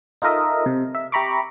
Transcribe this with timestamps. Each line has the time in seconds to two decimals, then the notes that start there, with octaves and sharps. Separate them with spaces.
0.22 D#4 F4 A4 A#4 D#5 E5
0.66 C3
0.95 E5
1.12 G4 E5 A#5 B5 C#6 D6